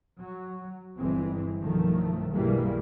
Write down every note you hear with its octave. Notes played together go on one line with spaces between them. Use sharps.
F#3
G1 E3 G#3 C4
B1 G2 D#3 F3 F#3 A3
B1 G2 E3 G3 G#3 A#3